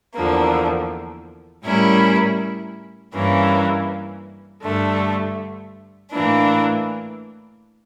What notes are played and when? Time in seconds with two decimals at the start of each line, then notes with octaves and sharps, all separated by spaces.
0.15 E2 D3 F3 A#3
1.63 A2 G3 C#4 E4 A#4
3.13 G2 E3 A#3 C#4
4.63 G2 D3 A3
6.11 A2 E3 A#3 D4